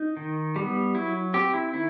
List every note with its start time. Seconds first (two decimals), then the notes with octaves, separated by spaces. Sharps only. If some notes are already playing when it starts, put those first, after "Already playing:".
Already playing: D#4
0.17 D#3
0.56 G3 B3
0.95 F#3 E4
1.34 C4 G4
1.54 E4
1.73 D#3 E4